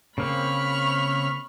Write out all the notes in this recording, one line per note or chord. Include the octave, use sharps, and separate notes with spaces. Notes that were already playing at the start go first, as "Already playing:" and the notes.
C#3 A#3 C4 B5 C#6 F6